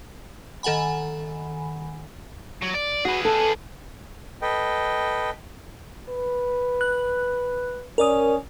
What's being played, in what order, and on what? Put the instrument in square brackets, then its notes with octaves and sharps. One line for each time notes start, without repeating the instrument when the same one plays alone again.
[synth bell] D#3 A4 F#5 G#5 B5
[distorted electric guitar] F#3
D5
[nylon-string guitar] F#4 [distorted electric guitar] G#4 B4
[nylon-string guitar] A4
[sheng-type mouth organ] A4 B4 D#5 G5
[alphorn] B4
[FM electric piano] F#6
[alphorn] C#4 [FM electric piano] A#4 D5 D#6